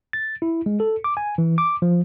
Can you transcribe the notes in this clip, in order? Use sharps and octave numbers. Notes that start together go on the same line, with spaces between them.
A6
E4
G#3
A4
D6
G#5
E3
D6
F3